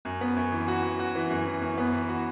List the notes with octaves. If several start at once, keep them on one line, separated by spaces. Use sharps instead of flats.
F#2
B3
F#2
E3
F#4
F#4
F#4
E3
F#2
E3
F#2
B3
E3
F#4